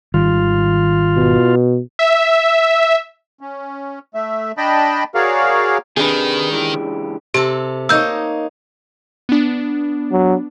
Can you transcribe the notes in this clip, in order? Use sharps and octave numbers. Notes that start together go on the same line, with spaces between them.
G#1 D#3 G3 F4
B2
E5
C#4
A3 E5
D4 D#5 G5 A5 B5
F#4 G#4 A#4 C#5 D5 F5
C3 D#3 D4 G4 G#4 B4
C#2 E3 G4
C3 G4 A4
A#3 D#4 C#5 E6 G6
B3 D4
F#3